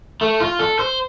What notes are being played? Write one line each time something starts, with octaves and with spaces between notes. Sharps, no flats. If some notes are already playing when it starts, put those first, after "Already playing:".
A3
F4
A4
C5